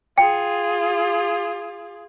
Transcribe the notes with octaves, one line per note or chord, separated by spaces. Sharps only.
F4 G#4 G5